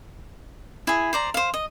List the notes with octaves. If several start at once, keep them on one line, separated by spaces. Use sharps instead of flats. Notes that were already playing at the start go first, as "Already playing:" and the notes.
E4 G#4
C5 D5 A#5
C5 F5
D#5